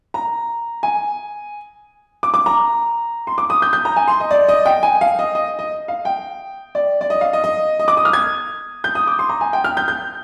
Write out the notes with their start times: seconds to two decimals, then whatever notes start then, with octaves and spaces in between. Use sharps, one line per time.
0.14 A#5
0.83 G#5
2.23 D6
2.34 D6
2.46 A#5
3.27 C6
3.38 D6
3.50 D#6
3.62 G6
3.73 G6
3.85 A#5
3.96 G#5
4.08 C6
4.20 D#5
4.31 D5
4.48 D#5
4.66 G5
4.83 G#5
5.01 F5
5.19 D#5
5.35 D#5
5.59 D#5
5.88 F5
6.05 G5
6.75 D5
7.01 D5
7.10 D#5
7.21 F5
7.33 D#5
7.44 D#5
7.80 D#5
7.88 D6
7.97 D#6
8.05 F6
8.13 G#6
8.84 G6
8.95 D#6
9.07 D6
9.19 C6
9.29 A#5
9.41 G#5
9.53 G5
9.64 F6
9.77 G6
9.88 G6